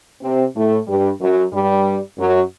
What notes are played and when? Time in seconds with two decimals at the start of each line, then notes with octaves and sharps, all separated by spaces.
0.22 C3 C4
0.55 A2 A3
0.87 G2 G3
1.20 F#2 F#3
1.52 G2 G3
2.18 F#2 F#3